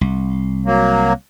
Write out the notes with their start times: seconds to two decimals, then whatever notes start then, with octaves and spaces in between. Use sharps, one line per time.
0.01 C2
0.66 F#3 A#3